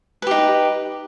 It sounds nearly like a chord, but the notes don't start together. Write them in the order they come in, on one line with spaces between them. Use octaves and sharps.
B4 G4 D#4